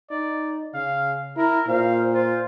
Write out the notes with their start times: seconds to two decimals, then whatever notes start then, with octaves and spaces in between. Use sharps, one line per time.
0.11 D#4 D5
0.74 C#3 F5
1.37 E4 A#4
1.68 A#2 C5 F5
2.14 F4 C5